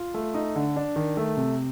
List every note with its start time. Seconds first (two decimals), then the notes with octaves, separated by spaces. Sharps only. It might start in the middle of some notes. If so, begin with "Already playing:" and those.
Already playing: F4
0.14 A3
0.34 D#4
0.56 D3
0.76 D4
0.96 D#3
1.17 A3
1.37 C3